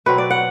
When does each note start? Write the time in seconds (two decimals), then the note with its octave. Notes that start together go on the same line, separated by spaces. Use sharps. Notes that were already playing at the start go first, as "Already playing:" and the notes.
0.06 B2 F#3 C4 B4
0.18 D5
0.30 F#5